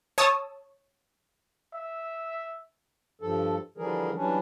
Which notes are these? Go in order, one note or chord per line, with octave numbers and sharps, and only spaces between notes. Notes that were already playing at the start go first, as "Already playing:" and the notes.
C#5 A5 D#6 E6
E5
G2 F3 A4
D3 E3 F3 G3 G#4 A#4
E3 F#3 G3 C#4 D4